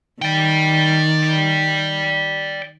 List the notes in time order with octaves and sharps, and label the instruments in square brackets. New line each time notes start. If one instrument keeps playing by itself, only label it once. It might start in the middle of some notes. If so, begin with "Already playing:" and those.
[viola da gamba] D#3 [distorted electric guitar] D5 G5